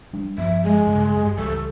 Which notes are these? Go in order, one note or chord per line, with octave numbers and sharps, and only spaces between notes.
G3 D4
G2 F3 B3 E5
G#3
G2 C#3
G2 G3
C#2 E3 G3 A4